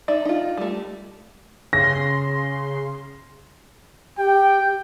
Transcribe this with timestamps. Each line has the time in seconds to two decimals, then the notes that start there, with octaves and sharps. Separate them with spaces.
0.08 D#4 D5 E5
0.25 D#4 F4
0.57 G3 A3
1.73 C#3 C6 A#6
4.18 G4 G5